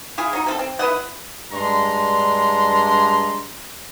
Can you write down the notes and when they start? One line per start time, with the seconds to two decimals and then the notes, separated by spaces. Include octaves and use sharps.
0.18 E4 F4 G#4
0.33 F#3 D#4
0.46 C4 F4 A4
0.59 C4
0.79 E4 B4 D#5 F#5
1.53 G2 G#3 D4 A#5 C6